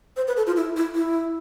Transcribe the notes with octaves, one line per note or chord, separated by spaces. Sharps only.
C5
B4
A4
F4
E4
E4
E4